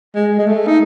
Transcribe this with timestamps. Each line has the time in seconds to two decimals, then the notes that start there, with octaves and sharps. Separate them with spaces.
0.15 G#3
0.39 G#3
0.47 A3
0.67 D#4